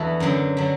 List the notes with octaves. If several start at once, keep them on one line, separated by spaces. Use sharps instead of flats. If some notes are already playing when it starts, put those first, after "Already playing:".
Already playing: E2 E3 D4 F#4 A4
F#2 D3 F#3
D3 F#3